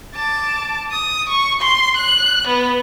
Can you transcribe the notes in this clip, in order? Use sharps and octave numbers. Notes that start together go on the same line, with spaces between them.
A5 D6
D#6
C#6
C6
F#6
B3